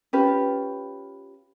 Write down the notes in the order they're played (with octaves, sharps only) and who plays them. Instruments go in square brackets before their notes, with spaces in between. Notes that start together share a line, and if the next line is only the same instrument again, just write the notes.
[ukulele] C#4 F4 G4 B4